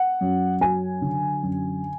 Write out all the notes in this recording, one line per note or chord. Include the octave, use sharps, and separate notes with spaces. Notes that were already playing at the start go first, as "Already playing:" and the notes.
Already playing: F#5
F#2
F#3 G#5
D3
F#2